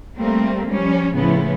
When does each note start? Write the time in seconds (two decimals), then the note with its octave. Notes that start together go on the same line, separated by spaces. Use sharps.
0.16 G3 A3 A#3 C4
0.68 F3 G3 C#4
1.13 A2 C#3 F3 B3 E4